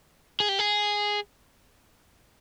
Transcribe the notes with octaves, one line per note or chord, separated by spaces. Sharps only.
G#4
G4
G#4